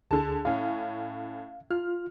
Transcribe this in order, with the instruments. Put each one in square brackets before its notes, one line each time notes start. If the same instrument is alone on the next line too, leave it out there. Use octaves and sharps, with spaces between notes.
[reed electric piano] D2 G#4 [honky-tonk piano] D3 A5
[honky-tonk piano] A2 C#4 [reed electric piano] F5
[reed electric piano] F4 [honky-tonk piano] F6